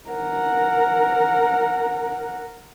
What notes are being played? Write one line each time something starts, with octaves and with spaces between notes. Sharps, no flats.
A#4 F#5